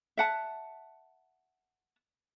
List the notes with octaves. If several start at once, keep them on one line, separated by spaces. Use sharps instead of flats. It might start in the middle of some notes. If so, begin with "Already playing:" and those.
E5 F#5 A5